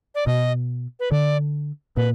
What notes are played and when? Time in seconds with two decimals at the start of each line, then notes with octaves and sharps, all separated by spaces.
0.15 D5
0.27 B2 D#5
1.00 B4
1.11 D3 D5
1.97 A#2 B4